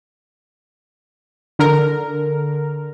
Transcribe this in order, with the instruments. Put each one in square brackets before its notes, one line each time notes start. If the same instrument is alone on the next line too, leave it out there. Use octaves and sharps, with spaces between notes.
[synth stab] D3 A#4